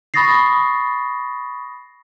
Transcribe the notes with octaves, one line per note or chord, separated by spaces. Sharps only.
B5 C#6 D#6 A6 A#6 C7